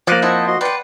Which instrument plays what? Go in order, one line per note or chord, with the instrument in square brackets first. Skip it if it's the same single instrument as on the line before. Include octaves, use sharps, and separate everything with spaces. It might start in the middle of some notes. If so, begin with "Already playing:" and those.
[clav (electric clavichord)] F3 A#3 [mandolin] D5 F#6
[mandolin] C4 E4 F#5 [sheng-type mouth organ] C5 D#5 A5
[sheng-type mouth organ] F#4 D#5 C6
[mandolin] B4 F#5 [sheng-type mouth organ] D5 G5 C6